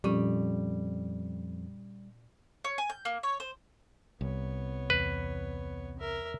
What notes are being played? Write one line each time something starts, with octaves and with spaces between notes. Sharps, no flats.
F2 A#2 G3 C#4
C#5
G#5
G6
A#3
C#5
C5
C2 B3 C#5
E2 B4
A#4 E5